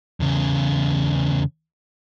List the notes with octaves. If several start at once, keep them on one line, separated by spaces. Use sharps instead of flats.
E2 C#3